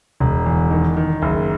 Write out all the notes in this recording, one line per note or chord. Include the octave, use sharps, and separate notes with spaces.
E1
E2
D#3
D#3
F#1